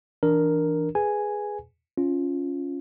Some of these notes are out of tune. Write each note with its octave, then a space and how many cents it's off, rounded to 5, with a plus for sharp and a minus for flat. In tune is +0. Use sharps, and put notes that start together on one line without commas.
E3 +0 D4 +5 A#4 +0
G#4 +0 B4 +0 G#5 +0
C#4 +0 F4 +0